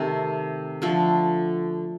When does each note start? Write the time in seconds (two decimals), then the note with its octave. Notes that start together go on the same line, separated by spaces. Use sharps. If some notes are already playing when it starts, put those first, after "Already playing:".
Already playing: C3 D#3 A3 C4
0.82 D3 F3 A3